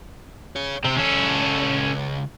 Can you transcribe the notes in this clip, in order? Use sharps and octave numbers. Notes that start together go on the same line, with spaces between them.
G#4 C#5
C3 C4 C5
C#2 C#4 A4 C#5